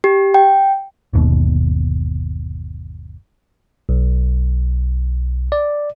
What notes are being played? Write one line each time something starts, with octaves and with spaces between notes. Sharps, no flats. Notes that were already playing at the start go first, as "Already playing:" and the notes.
G4
G5
G1 D#2 B2
B1
D5